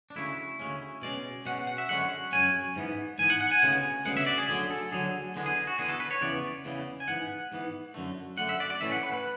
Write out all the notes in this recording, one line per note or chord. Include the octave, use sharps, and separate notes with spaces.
D4
D2 C#3 G#3 C#4 E4
D2 C#3 G#3 C#4
B2 G#3 C#4 D5
B2 G#3 C#4 F#5
F#5
E5
F#2 D3 G#3 C#4 F#5
F#2 D3 G#3 C#4 G#5
G#2 E3 B3
G#2 E3 B3 G#5
F#5
F#5
G#5
D2 C#3 G#3 B3
D2 C#3 G#3 B3 F#5
E5
D5
G#4
D2 D3 F#3 G#4
A4
D2 D3 F#3 G#4
E2 D3 G#3 B3
G#4
F#4
E2 D3 G#3 B3 G#4
A4
B4
C#5
E2 C#3 E3 B3 D5
E2 C#3 E3 B3
G#5
G#2 E3 B3 F#5
G#2 E3 B3
F#2 D3 A3
F#2 D3 A3 F#5
E5
D5
D5
A2 E3 A3 C#4 E5
F#5
B4
B4